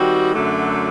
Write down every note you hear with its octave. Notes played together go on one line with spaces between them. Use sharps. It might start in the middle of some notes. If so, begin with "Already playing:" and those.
Already playing: D#3 G3 C4 F#4
F#2 D3 F#3 A3